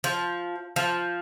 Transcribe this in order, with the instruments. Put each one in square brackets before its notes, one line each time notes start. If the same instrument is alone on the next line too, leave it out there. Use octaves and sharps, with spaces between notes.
[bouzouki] F3
F3